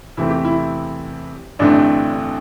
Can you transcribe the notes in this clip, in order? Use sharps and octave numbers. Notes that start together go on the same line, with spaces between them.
E2 C3 E3 A3 C4 E4
G4
E4
A1 G2 D3 A3 C4 D4